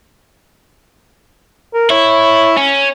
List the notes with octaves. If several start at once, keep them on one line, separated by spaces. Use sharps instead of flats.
A#4
E4 C#5
C#4